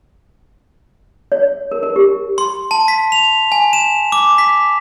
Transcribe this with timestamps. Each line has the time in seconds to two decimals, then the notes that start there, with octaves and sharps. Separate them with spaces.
1.32 C#5
1.71 A#4
1.83 A#4
1.96 G4
2.38 C6
2.71 A5
2.88 B6
3.12 F7
3.52 G#5
3.73 E7
4.12 D6
4.38 B6